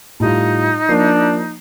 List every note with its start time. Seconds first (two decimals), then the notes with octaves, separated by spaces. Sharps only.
0.20 A2 G3 D#4 F4
0.89 F3 A#3 D4 C7